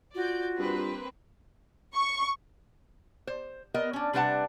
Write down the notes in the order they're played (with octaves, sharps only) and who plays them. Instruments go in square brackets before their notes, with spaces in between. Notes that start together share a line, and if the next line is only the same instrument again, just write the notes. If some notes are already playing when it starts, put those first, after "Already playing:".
[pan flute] F4 [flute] F#4 [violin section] D5 G6
[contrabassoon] G2 [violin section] A#3 C4 B4
[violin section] C#6
[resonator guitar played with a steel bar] C5
B3 A#4 D#5
C#4 D4
C3 G3 D4 B4 F#5 A5